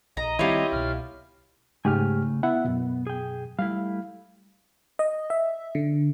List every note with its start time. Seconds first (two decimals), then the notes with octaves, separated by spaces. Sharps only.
0.17 A#1 D#5 A#5
0.39 D#3 G3 C4 E4 F4 G4 C#5
0.72 C2 B2 F6
1.85 G#2 C#3 A3 G4 G#5 F6
2.43 B3 E4 E5 F#5
2.65 F#2 B2
3.07 G#4 G5
3.59 G3 A3 E4 F5
4.99 D#5
5.30 E5
5.75 D3